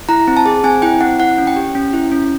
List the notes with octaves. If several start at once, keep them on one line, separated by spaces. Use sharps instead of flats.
E4 A#5
C4
A5
G#4
C4 G#5
E4 G5
C4 F#5
E4 F#5
C#4
G5
G4
C#4
E4
C#4